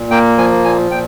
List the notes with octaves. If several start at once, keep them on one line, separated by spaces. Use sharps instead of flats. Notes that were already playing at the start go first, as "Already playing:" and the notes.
Already playing: A#2
A#3 G5
F3 G#5
A#2 G#5
A#2 G5